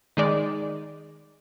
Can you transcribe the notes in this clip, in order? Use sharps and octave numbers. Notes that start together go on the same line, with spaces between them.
D#3 G#3 D5